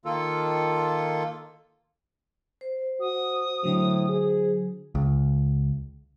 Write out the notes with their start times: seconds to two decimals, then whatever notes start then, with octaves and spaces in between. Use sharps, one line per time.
0.05 D#3 A#3 F4 A4
2.61 C5
3.00 F#4 D#6
3.64 A2 D3 F#3
4.09 G#4
4.95 C#2